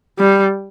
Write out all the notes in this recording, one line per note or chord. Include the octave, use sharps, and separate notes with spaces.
G3